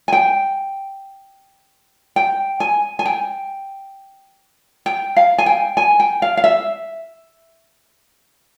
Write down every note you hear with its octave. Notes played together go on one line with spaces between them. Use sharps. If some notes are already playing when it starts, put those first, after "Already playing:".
G#5
G5
G5
G#5
G#5
G5
G5
F5
G#5
G5
G#5
G5
F5
F5
E5